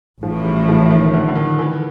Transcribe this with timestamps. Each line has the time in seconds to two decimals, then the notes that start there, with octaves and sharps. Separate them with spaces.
0.22 A1 A2 E3 F3
0.45 G3
0.69 F3
0.91 D#3
1.06 D#3
1.14 D3
1.28 D3
1.35 D#3
1.59 E3